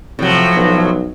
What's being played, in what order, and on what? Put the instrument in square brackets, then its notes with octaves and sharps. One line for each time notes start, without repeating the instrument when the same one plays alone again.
[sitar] A2 F#3 [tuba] C3 [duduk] F3
[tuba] B1